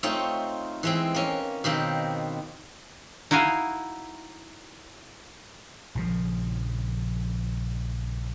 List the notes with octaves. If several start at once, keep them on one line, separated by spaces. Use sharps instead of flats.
A3 C4 D#4 F4 C#5
E3 G#3 C4
A#3 C#4
B2 D#3 A#3 C4
D#4 E4 F#4 F5 G#5
A#1 C#3 F3